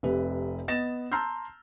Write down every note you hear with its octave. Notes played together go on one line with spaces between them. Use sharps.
F1 C3 B4
B3 D#5 A6 A#6 E7
A5 A#5 C6 E6 F6 G6